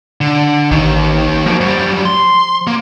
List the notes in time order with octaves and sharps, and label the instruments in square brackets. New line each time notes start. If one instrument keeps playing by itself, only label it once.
[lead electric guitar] D3
[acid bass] A1 [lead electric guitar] D#2 D#3
[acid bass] F3 [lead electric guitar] F#3 A#3
[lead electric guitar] F#2 G3
C6
A#3